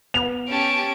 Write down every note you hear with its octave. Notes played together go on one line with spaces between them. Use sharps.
B3 F7
C#4 G4 A5 D7